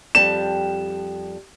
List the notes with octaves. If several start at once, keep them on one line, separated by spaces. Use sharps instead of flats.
F2 G3 A5 E7